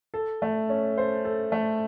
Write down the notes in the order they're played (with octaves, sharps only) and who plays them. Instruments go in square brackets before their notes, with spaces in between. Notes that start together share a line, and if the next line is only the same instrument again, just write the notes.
[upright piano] A4
A3
C#4
C5
A4
A3